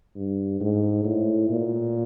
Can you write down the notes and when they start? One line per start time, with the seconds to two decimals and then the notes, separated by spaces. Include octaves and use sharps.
0.16 G2
0.61 G#2
1.04 A2
1.49 A#2